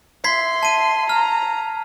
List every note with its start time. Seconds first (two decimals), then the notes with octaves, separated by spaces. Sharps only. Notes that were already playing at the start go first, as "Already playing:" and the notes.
0.24 E5 C6 G#6 B6 C7
0.63 A5 D#7
1.09 A#5 F6